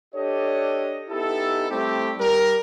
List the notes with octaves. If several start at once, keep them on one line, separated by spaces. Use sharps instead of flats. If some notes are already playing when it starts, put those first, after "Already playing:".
D4 G4 A4 C#5 D#5
B3 D#4 E4 G4 A4
G3 A3 C4 E4 G4
G3 A#4